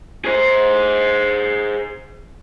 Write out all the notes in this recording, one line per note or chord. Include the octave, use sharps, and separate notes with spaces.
G#4 C5